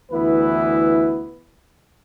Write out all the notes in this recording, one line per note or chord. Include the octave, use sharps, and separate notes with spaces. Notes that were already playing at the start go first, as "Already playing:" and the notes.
D2 E3 B3 E4 B4